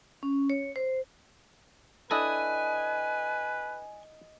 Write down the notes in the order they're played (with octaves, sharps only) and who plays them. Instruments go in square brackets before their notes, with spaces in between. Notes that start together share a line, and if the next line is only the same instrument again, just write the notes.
[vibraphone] C#4
C#5
C5
[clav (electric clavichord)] D4 E4 A4 [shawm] B4 [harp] D#5 [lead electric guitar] G#5